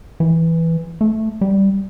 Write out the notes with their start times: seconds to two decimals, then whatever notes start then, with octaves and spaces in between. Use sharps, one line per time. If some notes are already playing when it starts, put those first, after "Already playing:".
0.20 E3
1.01 A3
1.41 G3